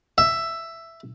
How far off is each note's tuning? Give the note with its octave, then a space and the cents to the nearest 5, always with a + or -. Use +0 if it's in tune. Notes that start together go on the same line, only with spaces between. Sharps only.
E5 +5